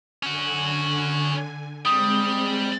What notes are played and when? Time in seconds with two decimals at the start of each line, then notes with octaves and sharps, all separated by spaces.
0.23 D3 C#4 F#4 G#5
1.85 G3 G#3 C4 D#6